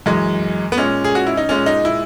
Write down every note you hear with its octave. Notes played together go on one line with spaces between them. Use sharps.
F#2 E3 G#3
B3
A#2 G#3 C#4
G#4
F#4
E4
D#4
A#2 G#3 C#4
D#4
E4